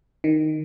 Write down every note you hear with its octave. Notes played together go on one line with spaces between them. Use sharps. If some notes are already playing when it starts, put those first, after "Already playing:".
D#3